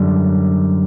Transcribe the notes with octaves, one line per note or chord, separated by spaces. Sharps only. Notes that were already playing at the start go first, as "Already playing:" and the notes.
Already playing: F#2 D3 G3